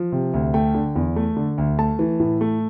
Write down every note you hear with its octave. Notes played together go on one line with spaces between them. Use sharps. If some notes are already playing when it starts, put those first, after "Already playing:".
Already playing: F3
C3
D2
A3 G5
D3
E2
A3
D3
D2
A3 A5
E3
A2
A3